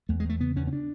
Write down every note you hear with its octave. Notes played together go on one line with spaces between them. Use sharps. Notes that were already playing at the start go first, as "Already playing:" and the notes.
E2 A3
G#3
E2 A3
C#3 B3
E2 C#4
C#4
D4